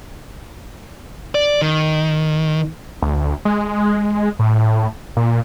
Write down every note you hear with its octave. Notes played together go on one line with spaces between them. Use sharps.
D5
D#3
D2
G#3
A2
A#2